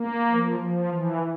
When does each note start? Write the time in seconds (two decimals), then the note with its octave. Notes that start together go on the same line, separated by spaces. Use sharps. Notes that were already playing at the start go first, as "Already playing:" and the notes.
Already playing: A#3
0.31 F3
0.60 F3
0.88 E3